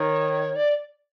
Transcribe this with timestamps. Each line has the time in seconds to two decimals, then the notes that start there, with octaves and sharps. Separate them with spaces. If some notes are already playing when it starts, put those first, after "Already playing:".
Already playing: D#3 C#5
0.56 D5